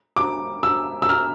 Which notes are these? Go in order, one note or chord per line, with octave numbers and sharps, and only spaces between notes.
D6
E6
E6
F6